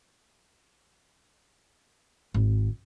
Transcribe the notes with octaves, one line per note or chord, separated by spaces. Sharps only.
G#1